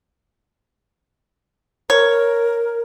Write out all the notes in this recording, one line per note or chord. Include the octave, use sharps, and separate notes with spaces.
A#4 C#5